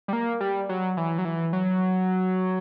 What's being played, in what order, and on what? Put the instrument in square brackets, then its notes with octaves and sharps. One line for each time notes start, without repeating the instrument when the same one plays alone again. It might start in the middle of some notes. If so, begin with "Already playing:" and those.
[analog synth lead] G3
A#3
G3
F#3
E3
F#3
E3
F#3